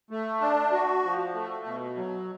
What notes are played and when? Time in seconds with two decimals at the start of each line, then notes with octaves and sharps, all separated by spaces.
0.11 A3
0.41 D4
0.72 F#4
1.04 F3
1.34 A3
1.66 B2
1.97 F#3